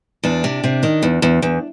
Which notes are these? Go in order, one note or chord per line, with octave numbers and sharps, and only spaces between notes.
E2 D4
C3
C3
D#3
E2
E2
E2